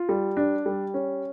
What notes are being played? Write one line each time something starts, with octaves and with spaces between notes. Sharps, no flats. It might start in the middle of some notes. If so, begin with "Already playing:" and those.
Already playing: F4
G3
D4
G3
C#4